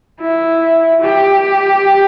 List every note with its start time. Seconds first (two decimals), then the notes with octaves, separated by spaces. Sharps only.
0.20 E4
1.01 G4